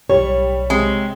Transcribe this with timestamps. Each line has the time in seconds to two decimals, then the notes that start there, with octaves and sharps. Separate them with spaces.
0.10 B1 A2 G3 C#5
0.70 C3 G#3